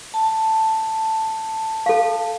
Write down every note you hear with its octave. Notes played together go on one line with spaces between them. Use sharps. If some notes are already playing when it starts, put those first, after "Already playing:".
A5
A4 F5